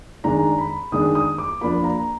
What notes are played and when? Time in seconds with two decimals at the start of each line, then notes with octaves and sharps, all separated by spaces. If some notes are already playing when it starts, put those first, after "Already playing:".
0.24 D#3 G#3 D4 A#5
0.58 B5
0.92 D#3 G#3 D4 D#6
1.15 D#6
1.38 D6
1.61 F3 A#3 D4 B5
1.84 A#5